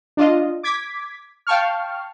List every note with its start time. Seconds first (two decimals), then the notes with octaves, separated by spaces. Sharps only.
0.17 D4 F4 D#5
0.63 D6 G#6 B6
1.47 F5 G5 A5 C#6 F6